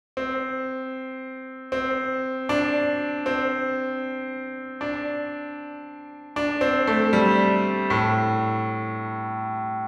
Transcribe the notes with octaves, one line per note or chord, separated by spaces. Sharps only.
C4
C4
D4
C4
D4
D4
C4
A3
G3
A2